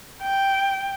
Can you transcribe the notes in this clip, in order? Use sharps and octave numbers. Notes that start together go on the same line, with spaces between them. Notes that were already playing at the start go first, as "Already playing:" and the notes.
G5